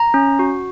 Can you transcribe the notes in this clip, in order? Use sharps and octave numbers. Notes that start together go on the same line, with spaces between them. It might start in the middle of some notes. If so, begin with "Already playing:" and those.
Already playing: A#5
C#4
F#4